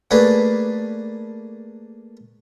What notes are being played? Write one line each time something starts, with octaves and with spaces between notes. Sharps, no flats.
A3 A#3 D4 G#4 B4